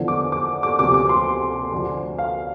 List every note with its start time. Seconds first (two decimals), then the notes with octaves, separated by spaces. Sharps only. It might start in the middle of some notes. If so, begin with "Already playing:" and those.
Already playing: E2 D3 F3
0.08 D6
0.32 D6
0.63 D6
0.79 D2 C3 F3 D6
0.94 D6
1.09 C6
1.72 D2 D3 F3
2.18 F5